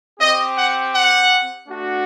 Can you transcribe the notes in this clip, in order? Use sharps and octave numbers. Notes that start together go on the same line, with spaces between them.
C4 G4 D#5
F#5
F#5
A3 D4 F#4